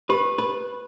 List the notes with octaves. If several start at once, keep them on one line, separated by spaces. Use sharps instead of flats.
G4 B4
B4